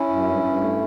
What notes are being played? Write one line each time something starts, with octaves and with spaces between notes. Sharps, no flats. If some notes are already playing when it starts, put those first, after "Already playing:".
Already playing: C#4 E4
F#2
G2
G2
A3